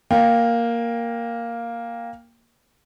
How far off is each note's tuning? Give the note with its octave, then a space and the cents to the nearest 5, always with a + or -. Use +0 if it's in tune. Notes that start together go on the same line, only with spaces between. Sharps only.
A#3 +0 G5 +15